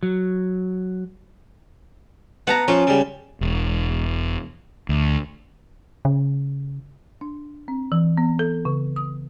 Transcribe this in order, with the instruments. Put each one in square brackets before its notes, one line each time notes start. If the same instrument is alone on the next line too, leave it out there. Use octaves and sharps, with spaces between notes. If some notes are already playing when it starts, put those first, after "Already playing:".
[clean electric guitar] F#3
[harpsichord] B3 [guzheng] F#5 A5 A#5
[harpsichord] F3 F4 [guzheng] C#4
[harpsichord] C#3 G3
[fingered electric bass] E1
D2
[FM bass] C#3
[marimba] D4
C4
E3
B3
A4
C#3
D#6